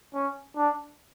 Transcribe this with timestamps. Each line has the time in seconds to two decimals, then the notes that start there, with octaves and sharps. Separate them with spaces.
0.14 C#4
0.56 D4